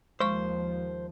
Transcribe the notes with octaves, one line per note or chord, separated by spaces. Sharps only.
D#2 F3 G#3 C5 C#6